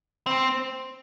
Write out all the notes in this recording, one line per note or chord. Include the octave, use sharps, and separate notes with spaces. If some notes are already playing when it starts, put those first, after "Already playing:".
C4